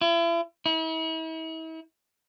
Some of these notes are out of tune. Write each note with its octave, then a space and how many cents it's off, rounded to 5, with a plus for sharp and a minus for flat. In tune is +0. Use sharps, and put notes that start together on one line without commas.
E4 +40
E4 -40